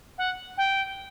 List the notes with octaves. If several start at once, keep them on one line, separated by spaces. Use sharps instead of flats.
F#5
G5